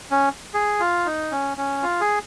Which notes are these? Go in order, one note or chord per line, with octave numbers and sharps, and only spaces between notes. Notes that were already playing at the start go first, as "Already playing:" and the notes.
C#4
G#4
F4
D#4
C#4
C#4
F4
G#4